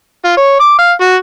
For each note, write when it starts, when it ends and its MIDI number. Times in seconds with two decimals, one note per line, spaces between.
0.24 0.34 65
0.37 0.59 73
0.60 0.75 86
0.78 0.93 77
1.01 1.15 66